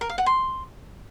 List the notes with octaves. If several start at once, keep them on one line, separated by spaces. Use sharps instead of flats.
A#4
F5
F#5
C6